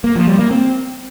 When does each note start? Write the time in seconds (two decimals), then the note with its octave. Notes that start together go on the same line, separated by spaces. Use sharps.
0.04 A#3
0.16 F3
0.27 G3
0.39 A#3
0.51 C4